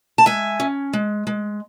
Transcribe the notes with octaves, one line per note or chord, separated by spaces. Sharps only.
A5
G#3 E5 G#5
C#4
G#3
G#3